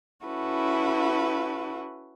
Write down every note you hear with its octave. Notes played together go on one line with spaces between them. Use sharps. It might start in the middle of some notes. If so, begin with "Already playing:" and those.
C#4 E4 F#4 A4 B4